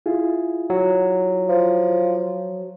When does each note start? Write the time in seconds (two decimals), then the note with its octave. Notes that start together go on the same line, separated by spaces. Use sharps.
0.06 E4 F4 G#4
0.70 F#3
1.49 F3